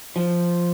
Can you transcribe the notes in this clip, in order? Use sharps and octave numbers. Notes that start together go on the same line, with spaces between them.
F3